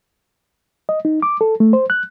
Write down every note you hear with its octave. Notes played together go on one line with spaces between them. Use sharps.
D#5
D#4
D6
A4
A3
C5
F#6